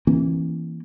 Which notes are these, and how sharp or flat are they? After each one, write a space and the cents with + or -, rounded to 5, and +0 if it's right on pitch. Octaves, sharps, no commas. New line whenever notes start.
E3 +0 A#3 +0 C#4 -40